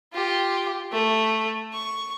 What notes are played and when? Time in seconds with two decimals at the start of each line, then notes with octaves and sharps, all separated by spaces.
0.13 F4 G4
0.92 A3
1.73 C#6